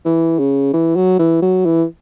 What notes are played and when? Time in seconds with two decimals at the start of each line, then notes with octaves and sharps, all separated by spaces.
0.05 E3
0.39 C#3
0.73 E3
0.96 F#3
1.19 E3
1.42 F#3
1.65 E3